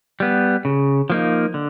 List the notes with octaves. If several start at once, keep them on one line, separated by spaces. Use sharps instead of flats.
G3 B3
C#3
F3 A#3 D#4
D3